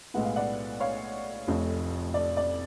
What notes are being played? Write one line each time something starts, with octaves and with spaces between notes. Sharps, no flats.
B1 A2 G#3 B3 F#5
F5
D5 F#5
C#5 F5
F1 F2 F3 A3
D5
D5